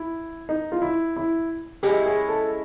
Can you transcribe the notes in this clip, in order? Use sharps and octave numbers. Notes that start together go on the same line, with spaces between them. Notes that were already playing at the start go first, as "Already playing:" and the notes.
Already playing: E4
D#4
F4
E4
E4
G#3 C#4 E4 G4
G#4
A4